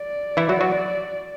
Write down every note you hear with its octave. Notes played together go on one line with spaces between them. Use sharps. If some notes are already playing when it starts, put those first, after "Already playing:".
Already playing: D5
E3 E4
F#3 F#4
F#3 F#4